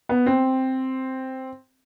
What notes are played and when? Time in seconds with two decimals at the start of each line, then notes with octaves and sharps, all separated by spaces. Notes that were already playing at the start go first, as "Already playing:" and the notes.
0.09 B3
0.26 C4